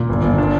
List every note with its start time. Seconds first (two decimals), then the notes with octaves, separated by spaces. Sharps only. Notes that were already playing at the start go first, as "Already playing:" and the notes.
Already playing: A#2
0.09 G1
0.23 G1
0.38 D4